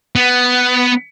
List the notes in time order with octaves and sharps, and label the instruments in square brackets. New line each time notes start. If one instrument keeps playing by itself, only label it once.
[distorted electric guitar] B3